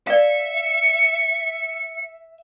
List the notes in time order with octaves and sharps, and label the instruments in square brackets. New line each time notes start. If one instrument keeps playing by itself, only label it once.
[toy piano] D5 F5 [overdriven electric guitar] E5 [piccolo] C#7